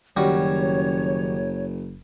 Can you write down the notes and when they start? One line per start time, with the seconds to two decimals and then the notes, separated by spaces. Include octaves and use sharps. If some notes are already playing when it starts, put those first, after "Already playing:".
0.17 F#1 D#3 F#3 G3 C#4 F#4 C#5